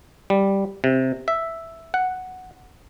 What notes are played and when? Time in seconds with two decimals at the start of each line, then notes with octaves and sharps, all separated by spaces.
0.30 G3
0.84 C3
1.28 E5
1.94 F#5